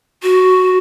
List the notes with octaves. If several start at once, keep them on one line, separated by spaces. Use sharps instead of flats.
F#4